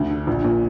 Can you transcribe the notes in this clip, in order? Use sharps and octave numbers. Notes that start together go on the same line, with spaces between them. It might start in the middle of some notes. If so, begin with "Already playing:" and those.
Already playing: D2
D3
A#1
A#2